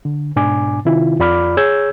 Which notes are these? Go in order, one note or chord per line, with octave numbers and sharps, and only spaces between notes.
D3
G#2 B2 D4 G#5 D6
C3 D#3 E4 F4
F2 F4 D5 B5 D6 F6
G#4 C#5 E6 G6 G#6